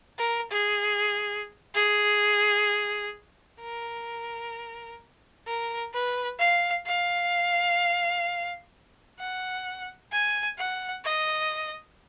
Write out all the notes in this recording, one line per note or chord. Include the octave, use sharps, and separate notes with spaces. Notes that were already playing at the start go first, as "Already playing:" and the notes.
A#4
G#4
G#4
A#4
A#4
B4
F5
F5
F#5
G#5
F#5
D#5